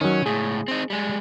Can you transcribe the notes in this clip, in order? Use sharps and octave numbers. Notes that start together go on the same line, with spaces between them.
D#3 F#3 C#4
C#2 A2 G#4
C4 D#4
G3 G#3